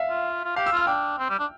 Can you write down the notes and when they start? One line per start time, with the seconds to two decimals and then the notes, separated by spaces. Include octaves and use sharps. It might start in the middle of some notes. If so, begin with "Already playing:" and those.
Already playing: E5 F5
0.09 F4
0.45 F4
0.56 G4 F5
0.66 E6
0.72 F4 F6
0.87 D4 G5
1.19 C4
1.29 G3
1.39 D4